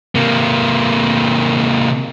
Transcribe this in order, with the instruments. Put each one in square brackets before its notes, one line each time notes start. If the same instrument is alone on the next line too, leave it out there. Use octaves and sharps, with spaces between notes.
[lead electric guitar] C3 A#3